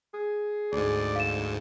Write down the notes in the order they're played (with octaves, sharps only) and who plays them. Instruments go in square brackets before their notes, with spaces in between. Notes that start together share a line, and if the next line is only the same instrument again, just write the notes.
[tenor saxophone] G#4
[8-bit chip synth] D2 G#2 [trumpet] D5
[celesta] F5 E7